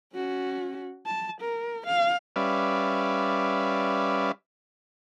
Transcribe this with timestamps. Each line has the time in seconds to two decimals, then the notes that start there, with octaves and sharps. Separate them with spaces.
0.14 C#4 F#4
1.06 A5
1.41 A#4
1.87 F5
2.36 G3 C#4 B4 D5 E5 F5